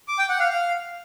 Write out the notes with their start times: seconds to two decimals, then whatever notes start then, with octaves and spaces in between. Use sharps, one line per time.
0.08 D6
0.19 G5
0.29 F#5
0.39 F5
0.50 F5